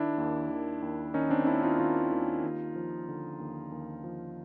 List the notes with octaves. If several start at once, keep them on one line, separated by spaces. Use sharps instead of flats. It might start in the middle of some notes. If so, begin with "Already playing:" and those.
Already playing: D#3 D4 E4
D#2
D#3
D#2
D#3 C#4 D#4
C4 D4
D#2 D4 E4
D#4 F4
D#3 D#4 F4
D#2
D#2
F3
D3
D#2
D#2
F3